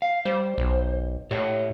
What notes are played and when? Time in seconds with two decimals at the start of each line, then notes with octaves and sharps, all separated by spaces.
0.02 F5
0.25 G3 C5
0.58 B1
1.31 A2 G4 C#5 D#5